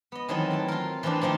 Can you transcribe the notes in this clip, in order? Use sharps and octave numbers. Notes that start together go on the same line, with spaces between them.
B3 D#5
D#3 E3 F#3 C4 E4 A4
A3 A4
F4 A#4
E3 F3 A3 C4 D4
D#3 F3 A3 A#3 C4